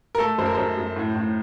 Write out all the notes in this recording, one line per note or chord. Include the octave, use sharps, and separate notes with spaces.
A#4
A3 A4
F#2 C5
A#4
F#2 C5
F#2
A2
A2